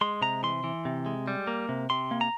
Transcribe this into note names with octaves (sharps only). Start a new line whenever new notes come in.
G#3 C6
C3 A#5
E3 C6
E3
C3
G#3
G3
A#3
C3
C3 C6
A#3
A#5